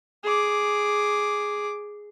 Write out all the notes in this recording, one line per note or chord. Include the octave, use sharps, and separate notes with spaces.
G#4 D6